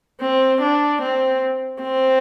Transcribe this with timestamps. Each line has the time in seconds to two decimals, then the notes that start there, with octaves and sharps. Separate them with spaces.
0.21 C4
0.62 D4
1.03 C4
1.83 C4